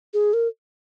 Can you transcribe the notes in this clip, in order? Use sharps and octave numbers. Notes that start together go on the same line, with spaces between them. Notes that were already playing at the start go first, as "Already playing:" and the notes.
G#4
A#4